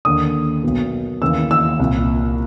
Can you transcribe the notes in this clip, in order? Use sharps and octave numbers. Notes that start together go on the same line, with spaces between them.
D#2 D3 D#6
B1 B2
D#2 C#3 E3 E6
E6
C2 A#2